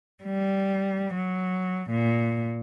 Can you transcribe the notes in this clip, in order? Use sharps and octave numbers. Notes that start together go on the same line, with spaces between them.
G3
F#3
A#2